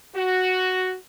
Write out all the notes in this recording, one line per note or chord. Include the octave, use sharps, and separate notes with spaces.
F#4